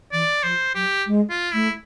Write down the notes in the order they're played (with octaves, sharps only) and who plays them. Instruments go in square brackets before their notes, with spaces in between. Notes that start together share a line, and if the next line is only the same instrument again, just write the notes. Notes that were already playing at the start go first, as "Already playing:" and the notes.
[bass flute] E3 [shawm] D5
[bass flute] F3 [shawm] C5
[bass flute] F#3 [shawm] G4
[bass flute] G#3
[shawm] F4
[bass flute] A3 [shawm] E4